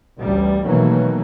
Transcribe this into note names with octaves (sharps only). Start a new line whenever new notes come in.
A1 D2 G3
B2 D#3 E3 F#3 A3 A#3